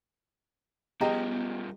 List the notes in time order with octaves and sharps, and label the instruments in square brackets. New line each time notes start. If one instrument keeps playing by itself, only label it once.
[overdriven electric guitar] G2 F3 [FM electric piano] B3 [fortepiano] G4 D#5 G5 [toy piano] G#4 A#5